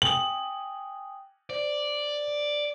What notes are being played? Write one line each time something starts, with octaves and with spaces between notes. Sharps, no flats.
G5 G#5 D#6 F#7
C5 D5